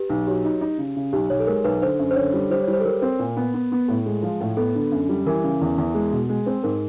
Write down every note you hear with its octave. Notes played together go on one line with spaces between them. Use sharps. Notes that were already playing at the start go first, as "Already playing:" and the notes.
Already playing: G4 B4
B1
F#3 G4
D#4
D#4
C#3
C#3
B1 G4
B1 C#5
A4
G#3 A#4
B1 B4
D3 C5
F#2
C5
D3 C#5
G3
G3 C5
C#5
G3
C5
A4
G3 A#4
C4
A#2
B3
B3
B3
A2
G#3
F3
A2
B3 A4
D3
F#2
G3
E3 A#4
C#3
E2
E2
G#3
B2
G#3
C4
G#2 A#4